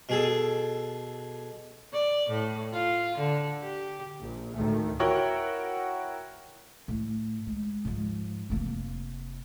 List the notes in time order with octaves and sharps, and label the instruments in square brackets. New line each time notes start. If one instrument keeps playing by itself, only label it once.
[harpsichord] B2 G#4 A4
[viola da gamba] D5
A2
F4
D3
G4
[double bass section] A#1
D2 A2 D#3 A3
[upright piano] E4 F#4 A#4 C#5 F#5 G5
[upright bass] A2
G#3
G#2 F3
F1 A#3